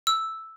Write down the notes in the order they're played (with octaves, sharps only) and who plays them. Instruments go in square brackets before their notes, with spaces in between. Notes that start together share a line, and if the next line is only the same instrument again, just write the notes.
[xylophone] E6